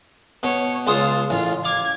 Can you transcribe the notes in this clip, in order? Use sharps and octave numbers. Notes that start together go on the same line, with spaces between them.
B2 C#5
C#2 F4 C5 D#6
A1 F4
F5 D6 G#6